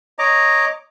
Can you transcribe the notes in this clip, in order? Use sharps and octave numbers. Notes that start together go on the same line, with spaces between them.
C#5 D#5 A#5 D6